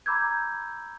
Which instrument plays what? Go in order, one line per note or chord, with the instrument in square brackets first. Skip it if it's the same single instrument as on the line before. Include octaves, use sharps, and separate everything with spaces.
[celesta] A#5 B5 D6 E6 G6 G#6